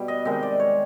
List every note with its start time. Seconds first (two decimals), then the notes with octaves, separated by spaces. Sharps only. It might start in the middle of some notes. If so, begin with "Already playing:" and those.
Already playing: B2 G3
0.08 D#5
0.25 C3 D#3 G#3 D#5
0.43 D5
0.60 C#5